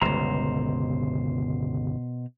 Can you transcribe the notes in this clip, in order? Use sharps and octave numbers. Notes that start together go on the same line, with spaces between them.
G1 C#2 B2 C5 A#5